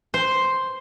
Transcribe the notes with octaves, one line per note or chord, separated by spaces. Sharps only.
C5